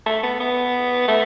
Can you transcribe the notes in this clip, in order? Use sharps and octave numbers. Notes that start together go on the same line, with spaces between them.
A3
B3
B3
A3